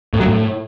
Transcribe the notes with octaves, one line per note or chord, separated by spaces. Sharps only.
A2
F#3
A2